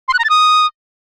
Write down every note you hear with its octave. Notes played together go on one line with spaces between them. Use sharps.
C6
F#6
A#5
A6
D#6